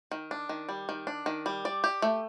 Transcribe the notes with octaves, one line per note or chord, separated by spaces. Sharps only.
D#3
D4
D#3
G3
D#3
D4
D#3
G3
D5
G4
A3